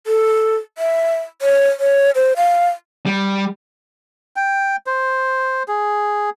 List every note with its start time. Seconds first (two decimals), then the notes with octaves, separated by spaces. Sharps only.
0.07 A4
0.78 E5
1.42 C#5
1.80 C#5
2.15 C5
2.37 F5
3.06 G3
4.36 G5
4.87 C5
5.68 G#4